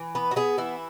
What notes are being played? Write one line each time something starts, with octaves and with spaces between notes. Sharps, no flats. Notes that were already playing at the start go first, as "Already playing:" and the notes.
Already playing: E3
B3 B4
F#4
B3 G#4
E3 E4